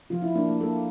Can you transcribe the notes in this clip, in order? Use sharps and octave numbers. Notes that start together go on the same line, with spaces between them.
F3 F4
E4
A#3 D4
A#3
A#3 A4